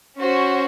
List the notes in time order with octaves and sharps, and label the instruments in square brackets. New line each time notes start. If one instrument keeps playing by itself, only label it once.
[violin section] C#4 F#4 C5